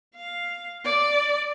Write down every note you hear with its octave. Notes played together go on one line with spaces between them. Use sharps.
F5
D5